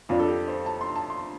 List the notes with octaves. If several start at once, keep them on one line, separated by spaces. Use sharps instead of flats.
F2 F3 D4 F4
A4
G4
C5
A5
C6
A5
C6